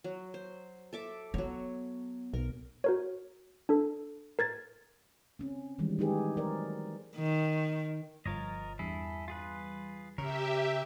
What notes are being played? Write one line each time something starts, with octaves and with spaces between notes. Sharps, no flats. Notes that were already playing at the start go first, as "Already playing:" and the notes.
F#3
C5
A4 E5 D6
F#3 B3 C#5
B1 A#4
F#4 A#4 C#5
D4 A4
A#4 G#6 A6
C4 C#4
D#3 E3 G3 G#3
G#3 A3 D#4 G4 G#4 B4
F#3 A#4 C5 D5
D#3
G1 F3 A#4 C#5 D#5 A6
E2 G2 E4 G#4 A4
F4 G#4 B4
C#3 G4 A#4 C#5 E5